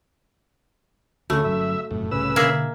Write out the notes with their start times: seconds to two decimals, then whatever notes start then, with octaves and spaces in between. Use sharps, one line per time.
1.30 D2 C#3 A3 F#4 A4
1.44 G1 F#3 C#4 E5
1.91 F1 F#2 A2 F#3
2.12 C2 A2 C#3 B4 E6
2.36 B2 D3 A#3 G#4 E5